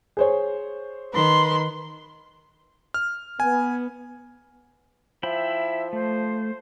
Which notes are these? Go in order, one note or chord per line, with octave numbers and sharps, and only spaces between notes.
G#4 C5 C#5
D#3 B4 C6
F6
B3 G#5
F3 E4 E5 G5 B5
A3 C5